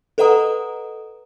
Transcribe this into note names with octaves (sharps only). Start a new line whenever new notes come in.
A4 B4 D#5 F#5 A#5 D#6